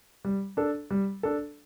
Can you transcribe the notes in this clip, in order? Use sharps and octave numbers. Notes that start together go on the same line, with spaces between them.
G3
D4 A4
G3
D4 A4